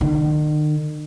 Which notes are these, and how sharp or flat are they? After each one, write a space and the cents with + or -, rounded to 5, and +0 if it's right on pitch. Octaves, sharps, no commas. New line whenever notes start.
D#3 -45